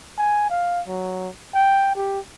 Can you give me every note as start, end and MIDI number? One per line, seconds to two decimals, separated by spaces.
0.18 0.49 80
0.50 0.81 77
0.87 1.29 54
1.54 1.91 79
1.95 2.19 67